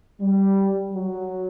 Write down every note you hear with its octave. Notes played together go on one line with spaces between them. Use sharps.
G3
F#3